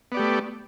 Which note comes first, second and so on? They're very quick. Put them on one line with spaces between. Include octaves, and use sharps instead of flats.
B3 D5 G4 A3